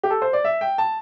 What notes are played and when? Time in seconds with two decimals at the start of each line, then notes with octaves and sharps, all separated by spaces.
0.03 G4
0.10 A4
0.22 C5
0.33 D5
0.44 E5
0.61 G5
0.78 A5